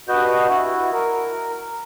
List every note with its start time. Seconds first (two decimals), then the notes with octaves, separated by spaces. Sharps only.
0.09 G2 F#4 B4 D#5 G6
0.49 E4 F#4
0.93 A#4